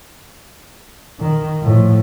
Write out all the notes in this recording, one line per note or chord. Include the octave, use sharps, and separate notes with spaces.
D#3
A2 F3